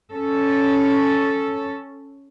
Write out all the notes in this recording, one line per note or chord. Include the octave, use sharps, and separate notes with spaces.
C#4 A4